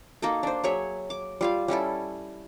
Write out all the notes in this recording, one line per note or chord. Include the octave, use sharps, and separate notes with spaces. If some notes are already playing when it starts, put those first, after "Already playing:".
A#3 D#4 F#4 A4
D4 C5
F#3 G#4 C#5 E5
D6
G3 F4 F5
G3 C#4 E4 A4